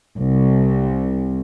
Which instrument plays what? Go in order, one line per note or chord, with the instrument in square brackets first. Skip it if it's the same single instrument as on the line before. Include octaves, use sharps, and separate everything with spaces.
[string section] C2